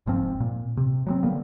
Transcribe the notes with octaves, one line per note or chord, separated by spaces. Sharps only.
F1 G#2 F3 C4
A#2
C3
F#3 G3 C4
D3 G3 A#3 B3